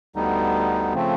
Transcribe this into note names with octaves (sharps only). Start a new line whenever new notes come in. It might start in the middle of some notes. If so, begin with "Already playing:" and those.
D2 D3 G3 B3 D#4
C#3 F3 A3 C4